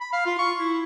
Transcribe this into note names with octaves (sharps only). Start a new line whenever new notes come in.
B5
F5
F4
C#6
E4